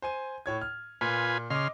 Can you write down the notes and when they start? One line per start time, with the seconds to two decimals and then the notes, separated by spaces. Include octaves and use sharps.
0.02 C5 G#5 D#7
0.46 A2 C#5 G#6
0.61 F6
1.01 A#2 F4 B4 G#5
1.50 C#3 D#5 C6 D6 F6